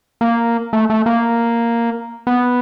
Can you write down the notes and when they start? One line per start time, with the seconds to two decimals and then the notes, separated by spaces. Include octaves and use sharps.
0.21 A#3
0.73 A3
0.90 A3
1.06 A#3
2.27 B3